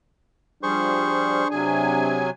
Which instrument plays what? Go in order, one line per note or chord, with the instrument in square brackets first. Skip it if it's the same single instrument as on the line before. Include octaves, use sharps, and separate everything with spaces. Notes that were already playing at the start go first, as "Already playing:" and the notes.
[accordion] F3 G3 [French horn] D4 [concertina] G#4 C5 C#6
[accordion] C3 F#3 G#5 [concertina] G#4